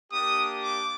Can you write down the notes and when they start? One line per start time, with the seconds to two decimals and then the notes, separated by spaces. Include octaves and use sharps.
0.11 A#3 D4 G4 D#6
0.61 D6